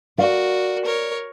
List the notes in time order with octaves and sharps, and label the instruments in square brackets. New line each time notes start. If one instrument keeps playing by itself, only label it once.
[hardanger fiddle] F#4 A#4 [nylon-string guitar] D5 F5
[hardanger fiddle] A#4 C#5